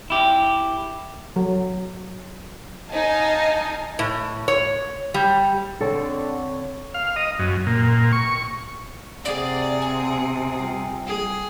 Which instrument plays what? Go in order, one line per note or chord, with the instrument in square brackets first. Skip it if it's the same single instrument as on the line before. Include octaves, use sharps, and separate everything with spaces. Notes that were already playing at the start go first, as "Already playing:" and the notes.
[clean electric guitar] E4 G4
[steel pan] F#3
[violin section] D#4 D#5 F5 G#5 A5
[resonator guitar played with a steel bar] A2
C#5
G3
[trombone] D3 [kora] C4 A4 [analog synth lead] C#5
[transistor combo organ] F5
D#5
F#2
A#2
C#6
[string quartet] C3 [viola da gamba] G#4 [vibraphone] C5 F#5 [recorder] D5
[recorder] G#5
[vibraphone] G3 F4
[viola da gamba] G#4